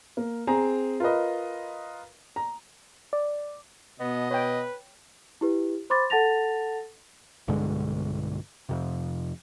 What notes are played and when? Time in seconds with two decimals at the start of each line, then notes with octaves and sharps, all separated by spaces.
0.17 A#3
0.47 C4 G#4 A#5
1.00 F4 A#4 B4 D#5
2.36 A#5
3.13 D5
4.00 B2 B3 D#5
4.31 B4 C#5 G5
5.41 E4 G4 B4
5.90 C5 B5 C6 D6 A6
6.10 A4 F#5 A5 A6 A#6 F7
7.48 B1 G2 D3 G#3
8.69 F2 C3